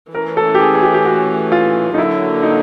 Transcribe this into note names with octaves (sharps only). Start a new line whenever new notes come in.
E3 A3 C#4 A#4
A4
G4
G#4
G#4
G4
G4
F#4
F4
D#4
D3 F#3 A#3 E4
D#4